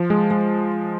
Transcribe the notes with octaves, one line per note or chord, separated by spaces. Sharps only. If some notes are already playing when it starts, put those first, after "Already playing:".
Already playing: F3
G#3
G#3